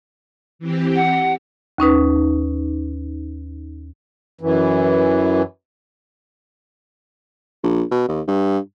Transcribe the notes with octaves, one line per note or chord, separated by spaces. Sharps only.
E3 C4 G4
F#5
D#2 C#4 D#4 B4
F#2 E3
A#1
B2
D#2
G2